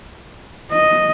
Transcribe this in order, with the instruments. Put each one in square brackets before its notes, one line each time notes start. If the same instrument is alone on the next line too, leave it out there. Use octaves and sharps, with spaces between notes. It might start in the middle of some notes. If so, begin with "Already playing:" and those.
[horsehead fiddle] D#5